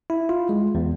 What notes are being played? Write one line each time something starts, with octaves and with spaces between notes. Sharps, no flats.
E4
F4
G#3
E2